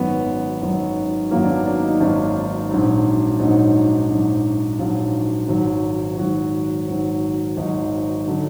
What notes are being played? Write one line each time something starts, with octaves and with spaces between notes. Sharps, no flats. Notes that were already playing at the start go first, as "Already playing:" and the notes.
Already playing: G#1 F#2 D#3 F#3 B3
G#1 F#2 D#3 F#3
G#1 F#2 D#3 F#3 A#3
D4
B3
D4
D#4
G#1 F#2 D#3 F#3 D4
A#1 G#2 F#3
A#1 G#2 F#3 D#4
A#1 G#2 F#3
A#1 G#2 F#3 F4
G#1 G#2 F#3
G#1 G#2 F#3 F#4
G#1 G#2 F#3
G#1 G#2 F#3 D#4
D3 F#3